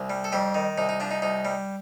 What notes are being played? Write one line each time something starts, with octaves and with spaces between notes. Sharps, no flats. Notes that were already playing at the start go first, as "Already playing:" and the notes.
Already playing: C2
G3
A4
F2 G3 G4
D#3
C2 D#4
D#4
F3 D4
D#4
C2 D#4
G3